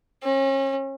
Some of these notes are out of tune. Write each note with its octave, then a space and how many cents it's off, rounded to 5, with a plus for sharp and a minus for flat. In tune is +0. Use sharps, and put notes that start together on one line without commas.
C#4 -35